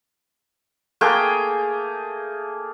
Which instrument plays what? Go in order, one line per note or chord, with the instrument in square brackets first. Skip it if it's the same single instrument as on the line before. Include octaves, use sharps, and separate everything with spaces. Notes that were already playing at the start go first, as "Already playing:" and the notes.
[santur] A3 A#3 G#4 G5